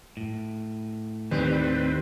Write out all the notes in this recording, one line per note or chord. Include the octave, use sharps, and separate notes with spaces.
A2
D#2 D#3 G3 C4 B4